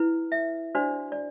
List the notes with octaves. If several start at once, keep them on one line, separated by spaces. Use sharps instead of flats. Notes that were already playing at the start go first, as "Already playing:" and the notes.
Already playing: E4 B4
E5
D4 F#4 C5 D5
D5